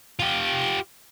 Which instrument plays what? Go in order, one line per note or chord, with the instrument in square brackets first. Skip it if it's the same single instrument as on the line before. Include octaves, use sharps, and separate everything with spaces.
[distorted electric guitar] F4 G4